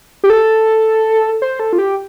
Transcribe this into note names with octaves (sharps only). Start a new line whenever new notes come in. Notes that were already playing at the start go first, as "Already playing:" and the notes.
G4
A4
C5
A4
F4
G4